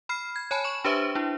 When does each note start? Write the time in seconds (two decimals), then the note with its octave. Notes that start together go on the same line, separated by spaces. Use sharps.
0.09 B5 F6 C7
0.36 G#6
0.51 C#5 G#5 A5 B5
0.64 C#6 E7
0.85 D4 G4 B4 C5 E5 C#6
1.15 D4 E4